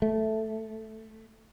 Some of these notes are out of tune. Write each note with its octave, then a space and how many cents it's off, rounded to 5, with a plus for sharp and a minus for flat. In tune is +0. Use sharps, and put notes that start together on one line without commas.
A3 +0